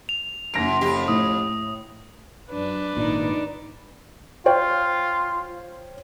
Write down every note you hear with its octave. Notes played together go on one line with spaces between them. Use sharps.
F7
F#1 F#2 A#6 D7
F2 G4
A2 D#6
F#2 D4 B4
G#1 A#2 D#4 D5
F4 C5 C#5 G5